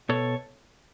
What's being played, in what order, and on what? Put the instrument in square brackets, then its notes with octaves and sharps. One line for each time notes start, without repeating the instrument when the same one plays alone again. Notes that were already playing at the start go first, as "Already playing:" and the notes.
[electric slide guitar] B2 A4 C#5